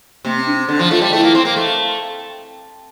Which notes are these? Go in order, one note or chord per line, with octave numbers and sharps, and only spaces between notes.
C3 A#3
C4
D4
C4
D3 D4
F3
A3 F4
G3
A3 E4
A#3
C4
A#3
A3